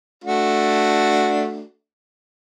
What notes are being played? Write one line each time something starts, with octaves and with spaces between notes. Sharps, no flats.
A3 D4 F#4